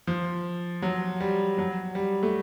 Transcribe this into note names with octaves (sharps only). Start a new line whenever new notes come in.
F3
F#3
G3
F#3
G3
A3